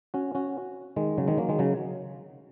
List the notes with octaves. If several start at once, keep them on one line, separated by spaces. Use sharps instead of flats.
C#4 F#4
C#4 F#4
D#3 G#3
C#3 F#3
D#3 G#3
F#3 A#3
D#3 G#3
C#3 F#3